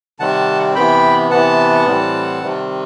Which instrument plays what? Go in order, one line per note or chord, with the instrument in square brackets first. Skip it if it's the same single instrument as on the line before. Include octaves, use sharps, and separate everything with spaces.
[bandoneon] C3 D#3 G3 C4 F#5 A5
C3 E3 B3 G5 B5
C3 E3 B3 F#5 A5
A2 E3 G3 C4
C3 D#3 G3 C4